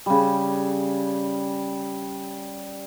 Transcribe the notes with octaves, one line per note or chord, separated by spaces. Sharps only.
C#3 G3